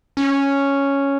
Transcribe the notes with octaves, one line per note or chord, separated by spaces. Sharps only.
C#4